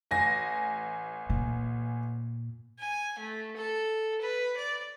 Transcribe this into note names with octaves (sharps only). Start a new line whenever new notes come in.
A1 G#5 A#6
A#2
G#5
A3
A4
B4
D5